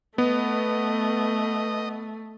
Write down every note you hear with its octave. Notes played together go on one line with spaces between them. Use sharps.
A3 B3 D#5